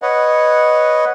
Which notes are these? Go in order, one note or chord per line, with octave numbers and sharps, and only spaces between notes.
B4 C#5 D#5 F#5